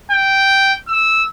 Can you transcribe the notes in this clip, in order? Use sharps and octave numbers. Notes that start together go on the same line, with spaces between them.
G5
E6